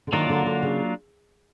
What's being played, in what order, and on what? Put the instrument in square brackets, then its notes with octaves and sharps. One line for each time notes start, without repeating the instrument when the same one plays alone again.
[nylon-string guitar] D3
[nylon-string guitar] D#3 [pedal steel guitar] F#3 A#3 D4 F4 A#4
[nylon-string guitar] D3
D3
C#3